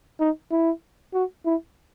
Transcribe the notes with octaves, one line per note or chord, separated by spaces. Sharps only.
D#4
E4
F#4
E4